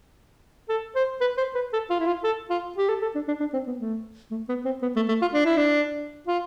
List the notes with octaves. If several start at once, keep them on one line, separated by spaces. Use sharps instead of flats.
A4
C5
B4
C5
B4
A4
F4
E4
F4
A4
F4
G4
A4
A4
D4
D4
D4
C4
B3
A3
A3
B3
C4
B3
A3
A3
F4
D4
E4
D4
F4